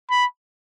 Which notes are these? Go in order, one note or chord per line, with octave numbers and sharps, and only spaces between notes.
B5